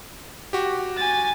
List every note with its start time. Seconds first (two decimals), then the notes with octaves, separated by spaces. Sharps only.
0.53 F#4 G4
0.97 G#5 A6